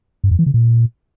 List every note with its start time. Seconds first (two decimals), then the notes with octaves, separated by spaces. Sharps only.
0.24 G2
0.31 F2
0.39 E3
0.46 C#3
0.54 A#2